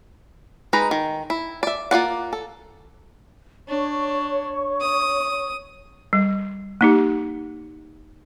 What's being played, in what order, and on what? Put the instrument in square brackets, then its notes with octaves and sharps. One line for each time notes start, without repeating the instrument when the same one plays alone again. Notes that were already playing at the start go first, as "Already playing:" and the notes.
[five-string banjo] G#3 D#4 B4 A#5
D#3
E4
D5 E5
A#3 F4 D5 F#5
A4
[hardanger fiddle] D4 [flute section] C#5 C#6
[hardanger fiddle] D#6
[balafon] G3
A#3 D#4 G4